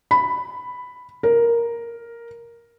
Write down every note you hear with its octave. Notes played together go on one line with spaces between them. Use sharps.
B5
A#4